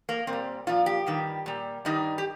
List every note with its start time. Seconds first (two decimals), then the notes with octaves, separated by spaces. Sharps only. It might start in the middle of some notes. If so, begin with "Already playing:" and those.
0.09 A#3
0.27 A#2 C4
0.33 G3
0.67 A#2 F3 F4
0.86 G4
1.06 G2 D#3 G3
1.46 A#2 G3
1.85 G2 D#3 G3 D#4
2.18 G4